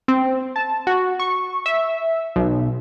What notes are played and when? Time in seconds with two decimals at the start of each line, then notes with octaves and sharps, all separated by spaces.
0.08 C4
0.56 A5
0.87 F#4
1.19 C#6
1.66 E5
2.36 B1